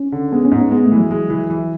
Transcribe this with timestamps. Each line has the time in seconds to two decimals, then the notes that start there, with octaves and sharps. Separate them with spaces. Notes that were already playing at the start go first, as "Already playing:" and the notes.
Already playing: C#4
0.12 D3
0.32 G#3 B3
0.45 C#4
0.52 G#2
0.58 B3
0.71 G#3 B3
0.85 A3
0.92 E3
0.97 F#3
1.11 G#3
1.30 E3
1.50 E3